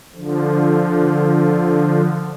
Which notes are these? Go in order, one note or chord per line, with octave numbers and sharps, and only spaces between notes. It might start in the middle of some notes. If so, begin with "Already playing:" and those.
D3 F3